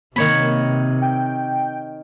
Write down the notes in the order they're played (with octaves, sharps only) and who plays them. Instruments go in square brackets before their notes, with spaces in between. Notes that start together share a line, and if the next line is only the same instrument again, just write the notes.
[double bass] C3 [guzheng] D#3 C#5 B5 [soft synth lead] A#3
[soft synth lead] G5